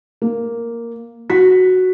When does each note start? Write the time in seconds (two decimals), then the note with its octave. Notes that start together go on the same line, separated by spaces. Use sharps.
0.22 A#3
1.30 F#4 B6